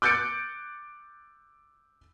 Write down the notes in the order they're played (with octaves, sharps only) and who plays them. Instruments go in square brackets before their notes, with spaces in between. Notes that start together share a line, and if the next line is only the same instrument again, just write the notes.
[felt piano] D6 F#6 G6 A6 C#7 D7